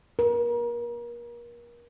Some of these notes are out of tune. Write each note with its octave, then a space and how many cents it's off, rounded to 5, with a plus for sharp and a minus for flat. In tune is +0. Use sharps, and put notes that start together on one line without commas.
A#4 +35